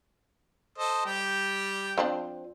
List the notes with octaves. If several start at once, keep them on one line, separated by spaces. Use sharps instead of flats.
A4 C5 D#5
G3 G4 G5
F3 C4 D4